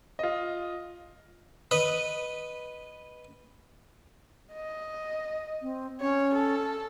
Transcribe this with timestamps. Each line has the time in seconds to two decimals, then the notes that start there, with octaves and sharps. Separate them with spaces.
0.19 F4 D#5
1.71 B4 D#5
4.53 D#5
5.62 C4
6.01 C#4 C#5
6.35 A4